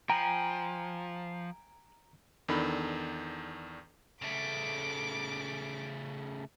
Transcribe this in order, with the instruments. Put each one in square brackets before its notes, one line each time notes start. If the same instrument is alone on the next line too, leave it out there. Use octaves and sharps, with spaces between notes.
[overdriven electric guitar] F3 [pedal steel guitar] G5 G#5 B5 [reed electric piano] A#5
[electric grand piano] E2 D#3 D4 A4 B5
[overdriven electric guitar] C#3 A3 [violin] D6